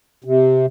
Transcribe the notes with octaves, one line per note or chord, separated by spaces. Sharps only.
C3